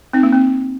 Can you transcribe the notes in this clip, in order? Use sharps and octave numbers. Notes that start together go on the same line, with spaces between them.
C4 D#4
A#3
C4